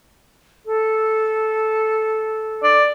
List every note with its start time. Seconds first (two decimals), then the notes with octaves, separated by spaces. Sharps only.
0.66 A4
2.63 D5